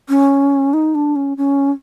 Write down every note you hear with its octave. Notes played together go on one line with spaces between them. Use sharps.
C#4
D#4
D4
C#4
C#4